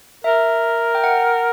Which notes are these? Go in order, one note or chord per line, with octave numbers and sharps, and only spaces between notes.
A#4 E5
G5
F#5